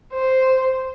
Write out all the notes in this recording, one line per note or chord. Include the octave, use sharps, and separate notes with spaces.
C5